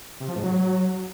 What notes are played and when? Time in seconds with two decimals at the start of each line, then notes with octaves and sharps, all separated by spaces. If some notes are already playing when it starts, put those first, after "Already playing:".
0.20 C3
0.28 F3
0.36 G#2
0.44 F#3